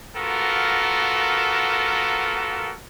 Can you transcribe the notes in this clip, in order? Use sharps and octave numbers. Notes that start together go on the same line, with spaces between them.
A#3 B3 F4 F#4 A4 A#4